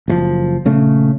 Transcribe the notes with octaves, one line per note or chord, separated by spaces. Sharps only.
F#1 B2 F3
A#1 C#3 A3